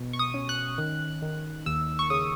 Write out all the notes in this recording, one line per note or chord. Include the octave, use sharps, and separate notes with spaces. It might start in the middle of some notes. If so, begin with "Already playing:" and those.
Already playing: B2
C#6
D#6
C#4
F#6
D#3
D#3
D#2 E6
C#6
C#3 D#6